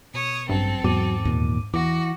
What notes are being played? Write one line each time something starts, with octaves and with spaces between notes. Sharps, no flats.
B2 C#5 D#6
A1 G2 F#3 C4 A4
E2 G#2 F#3 D6 D#7
D#2 A#2
E2 E3 F#4 D6 A#6